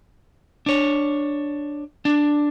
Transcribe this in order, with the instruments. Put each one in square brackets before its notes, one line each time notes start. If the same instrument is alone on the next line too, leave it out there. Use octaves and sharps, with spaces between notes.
[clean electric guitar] D4 C#5
D4